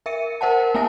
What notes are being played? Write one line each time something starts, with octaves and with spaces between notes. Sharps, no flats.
A#4 E5 C#7 D#7
A#4 C5 F#5 A5
A#3 B3 E4 G#5 A5 A#6